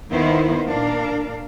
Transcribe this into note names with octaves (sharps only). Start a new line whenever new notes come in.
D#2 D#3 B3 D#4 E4 C5
A#2 D4 A#4 F5